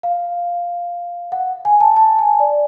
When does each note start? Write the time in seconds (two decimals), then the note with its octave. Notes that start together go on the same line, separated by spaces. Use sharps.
0.03 F5
1.32 F#5
1.65 G#5
1.81 A5
1.96 A5
2.19 G#5
2.40 D5